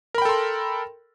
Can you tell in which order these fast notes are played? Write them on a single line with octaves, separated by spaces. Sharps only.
A#4 B5 G5 A4 C6